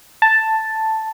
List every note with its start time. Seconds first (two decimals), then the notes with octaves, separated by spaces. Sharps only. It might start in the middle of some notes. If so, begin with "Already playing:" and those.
0.22 A5